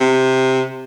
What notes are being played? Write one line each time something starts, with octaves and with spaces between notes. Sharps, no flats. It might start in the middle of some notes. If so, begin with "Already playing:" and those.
C3